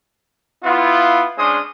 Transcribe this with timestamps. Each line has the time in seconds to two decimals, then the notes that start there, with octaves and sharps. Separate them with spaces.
0.64 B3 E4 F4
1.38 G#3 C#4 D4 C5 C6 D#6